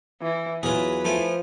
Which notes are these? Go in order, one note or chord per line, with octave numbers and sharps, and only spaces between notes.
E3
E2 F#3 F4 G#4 B4
F3 A3 F4 G#5